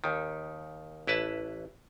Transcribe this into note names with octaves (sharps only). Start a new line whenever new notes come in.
D#2 D#3
A1 E4 B4 A5